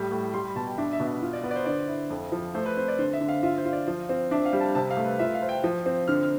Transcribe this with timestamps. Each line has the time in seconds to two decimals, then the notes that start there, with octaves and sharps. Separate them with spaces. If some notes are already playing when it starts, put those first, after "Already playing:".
Already playing: A2 G3
0.11 A2
0.34 G3 C6
0.45 B5
0.55 B2 A5
0.67 G5
0.78 D4 E5
0.93 E5
1.00 B2
1.07 E5
1.22 F4
1.33 D5
1.44 B3 B4
1.51 D5
1.56 C5
1.66 D3 D5
1.88 E4
2.10 F2
2.32 F3
2.55 A3 C5
2.66 B4
2.77 C4 C5
2.88 D5
2.99 D3 C5
3.13 E5
3.21 D3
3.28 F5
3.43 F4 E5
3.58 C5
3.65 F4
3.73 D5
3.87 F3 C5
4.09 C4
4.31 D4 E5
4.46 F5
4.53 G3
4.60 A5
4.75 C3 A5
4.91 F5
4.97 A3
5.04 B4
5.19 F4 E5
5.34 F5
5.42 C5
5.49 G5
5.64 F3
5.86 C4
6.08 D3 F6
6.23 F6